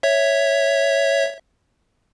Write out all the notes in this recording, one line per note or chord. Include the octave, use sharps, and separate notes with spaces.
C#5 E5